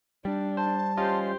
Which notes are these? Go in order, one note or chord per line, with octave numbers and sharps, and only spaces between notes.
G3 D4
C5 A5
C#4 F4 G4 C5 D#5